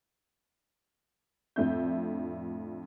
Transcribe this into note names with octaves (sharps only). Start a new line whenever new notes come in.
F2 A2 D4 E5 G6